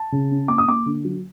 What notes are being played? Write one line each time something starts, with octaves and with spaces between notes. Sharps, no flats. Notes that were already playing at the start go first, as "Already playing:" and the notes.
Already playing: A5
C#3
C#4
A#3 D6
D#6
A#3 D6
D3
F#3